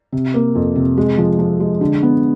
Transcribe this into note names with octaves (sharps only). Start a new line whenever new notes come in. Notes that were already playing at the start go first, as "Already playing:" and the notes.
C3
A#3
F2
C3
G#3
F3
F3
G#3
D3
B3